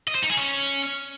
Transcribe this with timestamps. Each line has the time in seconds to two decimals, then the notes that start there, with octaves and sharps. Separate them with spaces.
0.08 D#5
0.15 C5
0.22 D#4
0.30 G#4
0.37 C#4